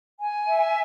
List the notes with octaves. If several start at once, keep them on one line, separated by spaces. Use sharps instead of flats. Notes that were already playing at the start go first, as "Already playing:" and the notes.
G#5
E5